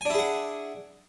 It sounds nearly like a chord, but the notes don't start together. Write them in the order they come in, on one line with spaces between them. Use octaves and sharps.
G#5 D4 E4 G#4 F#5